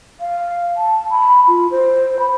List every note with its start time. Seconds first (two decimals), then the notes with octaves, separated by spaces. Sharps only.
0.20 F5
0.77 A5
1.10 B5
1.48 F4
1.71 C5
2.19 B5